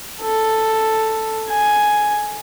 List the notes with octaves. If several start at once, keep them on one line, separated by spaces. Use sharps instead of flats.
A4
G#5